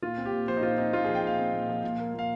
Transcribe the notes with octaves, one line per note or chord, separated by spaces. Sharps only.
A#2 F4
C4
G4
A#2
F3 C5
D#4
A#2 F4
C4 D#4
A#2 F4
G#4
F3
G5
A#2 F5
C4
A#2
F3
A#2
A#3
A#2 F5